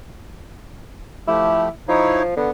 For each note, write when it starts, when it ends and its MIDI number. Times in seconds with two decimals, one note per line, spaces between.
1.28 1.69 53
1.28 1.69 57
1.28 1.70 64
1.28 1.69 67
1.88 2.33 53
1.88 2.23 63
1.88 2.23 64
1.88 2.23 73
2.37 2.50 50
2.37 2.51 59